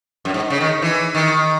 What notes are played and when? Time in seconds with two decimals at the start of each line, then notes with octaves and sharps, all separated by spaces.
0.25 F#2
0.34 G#2
0.50 C#3
0.61 D#3
0.82 E3
1.15 D#3